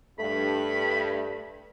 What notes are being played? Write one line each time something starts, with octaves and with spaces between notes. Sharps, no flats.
G2 A3 B5